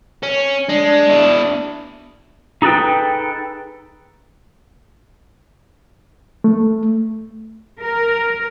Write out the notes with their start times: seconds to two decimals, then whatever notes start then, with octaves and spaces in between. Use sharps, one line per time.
0.23 C#4
0.69 G#3 D4
1.10 B2 E4
2.62 D#4 G#4 A4 B4 G5
6.44 A3
7.79 A#4